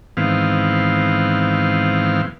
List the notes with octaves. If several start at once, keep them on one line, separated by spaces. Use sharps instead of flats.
G#2 D#3 E3 B3 C4 F5